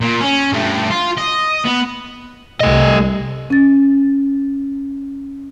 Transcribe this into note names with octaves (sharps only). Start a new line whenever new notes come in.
A#2
C#4
G2 A3
F4
D#5
B3
C2 A3 D#5
C#4 A6